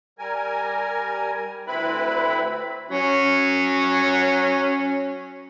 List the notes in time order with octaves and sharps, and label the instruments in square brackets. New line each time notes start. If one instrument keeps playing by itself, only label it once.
[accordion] G3 A#4 G#5
D2 C4 E4 B4 B5
[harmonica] F#3 C#4